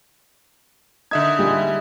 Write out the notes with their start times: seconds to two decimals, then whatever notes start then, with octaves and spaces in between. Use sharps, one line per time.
1.11 D3 D#4 E5 G#6
1.39 G3 F4 G#4